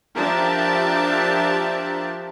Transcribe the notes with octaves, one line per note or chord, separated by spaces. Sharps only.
F3 D4 G4 A#4 E5 A5